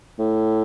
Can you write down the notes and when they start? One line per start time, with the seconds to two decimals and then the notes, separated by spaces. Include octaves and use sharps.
0.19 A2